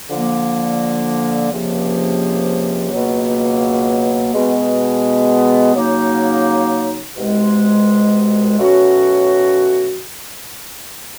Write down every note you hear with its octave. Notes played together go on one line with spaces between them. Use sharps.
D3 F3 A#3
C#2 C3 F3 A#3
C#2 B2 F#3 A#3
B2 G#3 B3
C#3 F#3 A#3 D#4
C2 B2 G#3
B2 F#3 A3 C#4 F#4